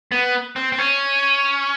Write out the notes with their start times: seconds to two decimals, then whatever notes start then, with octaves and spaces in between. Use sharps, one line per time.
0.12 B3
0.56 C4
0.72 C4
0.79 C#4